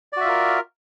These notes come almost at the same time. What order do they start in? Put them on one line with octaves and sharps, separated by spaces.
D5 F#4 E5 F4 A#4